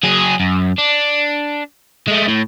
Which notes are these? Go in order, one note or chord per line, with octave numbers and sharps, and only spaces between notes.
F#3 G#4
F#2
D4
G#3 A3
A2